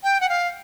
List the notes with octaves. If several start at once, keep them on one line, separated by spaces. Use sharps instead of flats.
G5
F#5
F5